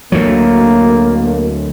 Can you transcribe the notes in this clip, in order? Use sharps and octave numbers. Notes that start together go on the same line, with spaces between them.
D2 F#3 A#3